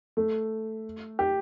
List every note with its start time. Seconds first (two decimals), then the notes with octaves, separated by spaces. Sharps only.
0.17 A3
1.19 G4